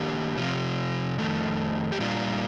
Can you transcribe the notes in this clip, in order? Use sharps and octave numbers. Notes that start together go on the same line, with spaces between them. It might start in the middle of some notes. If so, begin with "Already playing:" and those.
Already playing: D#3 A#3 D4 G4
C3 F3 C4 F4
F2 D#3 A3
G4
A#2 G3 A#3 D4 F4